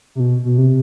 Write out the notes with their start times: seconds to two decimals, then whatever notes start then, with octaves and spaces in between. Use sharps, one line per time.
0.15 C3
0.20 B2
0.45 B2
0.58 C3